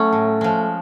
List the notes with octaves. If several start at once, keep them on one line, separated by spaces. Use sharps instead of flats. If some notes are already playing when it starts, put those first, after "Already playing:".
Already playing: F#3 A3 C#4
A2
F3 G#3